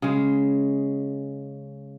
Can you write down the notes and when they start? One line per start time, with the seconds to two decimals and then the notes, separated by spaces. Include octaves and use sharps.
0.02 C#3 G#3